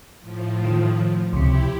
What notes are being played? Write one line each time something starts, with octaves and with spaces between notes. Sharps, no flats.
A2 F3
D#3
C#2 C3 E4 G4